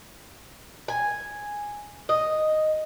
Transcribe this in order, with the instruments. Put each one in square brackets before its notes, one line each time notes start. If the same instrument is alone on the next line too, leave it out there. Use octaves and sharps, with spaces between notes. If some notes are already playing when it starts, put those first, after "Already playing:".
[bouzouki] G#5
D#5